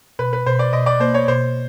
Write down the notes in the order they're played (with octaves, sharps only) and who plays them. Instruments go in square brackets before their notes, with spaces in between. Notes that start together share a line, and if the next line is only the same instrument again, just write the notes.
[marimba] B2 [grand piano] B4
[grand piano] B4
[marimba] B2 [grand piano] C5
[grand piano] D5
[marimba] B2 [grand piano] D#5
[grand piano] D5
[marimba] A#3 [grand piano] C5
[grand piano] C#5
[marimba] B2 [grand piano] C5